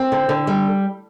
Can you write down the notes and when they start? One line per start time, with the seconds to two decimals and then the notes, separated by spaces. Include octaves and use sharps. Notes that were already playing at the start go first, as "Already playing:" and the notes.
Already playing: C4
0.12 D3
0.29 D3
0.47 G3